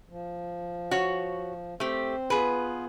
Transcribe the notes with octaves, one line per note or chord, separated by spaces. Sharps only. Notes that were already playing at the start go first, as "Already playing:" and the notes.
F3
F#4 C#5
A3 C4 G4 C5
B3 F4 G#4 B4